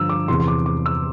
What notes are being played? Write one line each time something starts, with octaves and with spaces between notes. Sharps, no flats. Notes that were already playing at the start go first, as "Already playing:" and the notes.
Already playing: G2 D3 F3 E6
D6
E2 C3 E3 C6
C6
D6
D6
E6